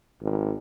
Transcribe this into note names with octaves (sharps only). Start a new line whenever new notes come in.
G#1